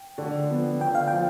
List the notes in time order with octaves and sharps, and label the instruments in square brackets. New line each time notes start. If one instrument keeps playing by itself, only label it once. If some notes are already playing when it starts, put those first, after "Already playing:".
Already playing: [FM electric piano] G5
[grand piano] D3
F3 B3
[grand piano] D3 [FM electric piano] G5
[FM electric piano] F5
[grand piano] F3 [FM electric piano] G5